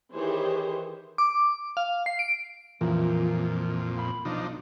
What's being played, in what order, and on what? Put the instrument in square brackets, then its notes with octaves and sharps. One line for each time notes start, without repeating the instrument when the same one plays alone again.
[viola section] D#3 E3 G4 G#4 C5 C#5
[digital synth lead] D6
F5
C7
D7
[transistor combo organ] F2 A#2 [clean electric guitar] E3 F3 A#4
[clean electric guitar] B5
[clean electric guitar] B1 [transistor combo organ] F3 D4 D#4